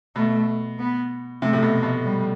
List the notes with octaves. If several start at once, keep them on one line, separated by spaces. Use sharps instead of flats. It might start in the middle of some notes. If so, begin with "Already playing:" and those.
B2 A3
B3
C3 A3
A2
B2
B2
G3